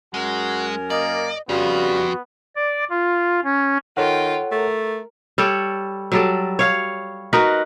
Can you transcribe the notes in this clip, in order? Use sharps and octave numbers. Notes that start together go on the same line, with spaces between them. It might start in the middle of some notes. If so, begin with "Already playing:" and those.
F#2 G#3 F#4 A#4 G#5
A#3 D5 D#5
F2 C#3 G3 B3 F4 F#4
D5
F4
C#4
D#3 F4 A4 C#5 F#5 G5
A3 A#4
G3 A4 C#5
F#3 G3 A4
C#5 F5
D#4 F#4 A#4 B4